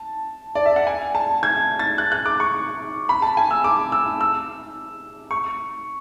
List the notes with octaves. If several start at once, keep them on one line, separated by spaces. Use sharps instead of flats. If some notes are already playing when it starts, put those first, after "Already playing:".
Already playing: A5
D5
E5
F#5
G#5
A5
G#6
A6
F#6
F#6
D6
C#6
B5
A5
G#5
E6
D6
E6
E6
C#6